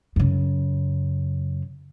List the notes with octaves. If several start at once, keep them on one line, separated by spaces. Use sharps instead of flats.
F#2 C#3